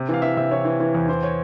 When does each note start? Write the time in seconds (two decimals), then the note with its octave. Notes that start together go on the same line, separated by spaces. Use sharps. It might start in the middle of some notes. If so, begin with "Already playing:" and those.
Already playing: C3
0.09 E3 F5
0.22 E3 E5
0.37 C3 E5
0.51 E3 C#5
0.65 E3
0.80 E3
0.95 E2
1.09 E3 C5
1.23 C#5